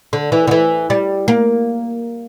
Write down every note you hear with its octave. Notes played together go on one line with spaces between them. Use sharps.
D3
E3
D3
E3
G3
A#3